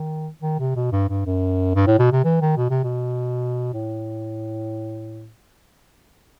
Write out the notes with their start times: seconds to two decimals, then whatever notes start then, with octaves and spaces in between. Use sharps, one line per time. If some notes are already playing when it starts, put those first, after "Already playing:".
Already playing: D#3
0.42 D#3
0.59 C3
0.76 B2
0.92 G2
1.09 G2
1.26 F#2
1.75 G2
1.87 A2
1.99 B2
2.12 C3
2.24 E3
2.41 D#3
2.57 B2
2.70 C3
2.84 B2
3.74 A2